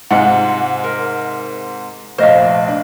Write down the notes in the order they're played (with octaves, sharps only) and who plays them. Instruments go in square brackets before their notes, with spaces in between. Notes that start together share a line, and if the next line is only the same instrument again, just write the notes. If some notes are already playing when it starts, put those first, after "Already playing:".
[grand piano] G#2 C3 G#3 [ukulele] F4 F#5
[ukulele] A#4
[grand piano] F1 A#1 [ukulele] C5 D#5 F5
[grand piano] D4